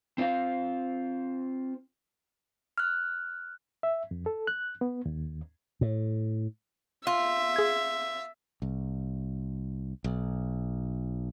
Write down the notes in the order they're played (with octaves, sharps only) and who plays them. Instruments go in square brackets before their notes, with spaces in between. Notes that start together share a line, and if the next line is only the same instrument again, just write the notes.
[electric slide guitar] C4 F4 C5 F5
[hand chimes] F6 F#6
[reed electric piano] E5
F2
A4
F#6
B3
D#2
[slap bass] A2
[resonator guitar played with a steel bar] F4 [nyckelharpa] E5
[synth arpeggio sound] G#4 G#6
[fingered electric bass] C2
B1